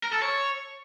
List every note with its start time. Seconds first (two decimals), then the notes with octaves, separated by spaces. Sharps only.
0.03 A#4
0.13 A4
0.22 C#5